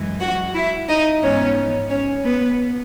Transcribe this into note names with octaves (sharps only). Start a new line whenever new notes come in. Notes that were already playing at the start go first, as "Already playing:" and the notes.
Already playing: F#2 E3 G#3
F#4 F#5
E4 E5
D#4 D#5
G#2 E3 G#3 B3 C#4 D#4 C#5
C#4 C#5
B3 B4